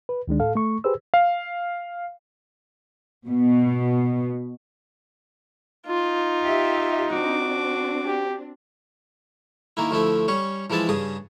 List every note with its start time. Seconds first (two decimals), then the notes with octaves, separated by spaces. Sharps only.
0.09 B4
0.28 D2 D#3 G#3 D4
0.40 A2 A4 F5
0.55 A3 C#6
0.84 G4 G#4 B4 C5 E6
1.14 F5
3.28 B2
5.87 D#4 F4
6.45 G4 E5
7.12 C4 D4 F#4 D6
8.06 G4
9.77 D#3 A#3 E4
9.91 D2 F3 A3 E4
10.28 G3 C#4 C#5
10.70 E3 F3 G#3 E4 A5
10.89 G2 C#3 G#4 D#6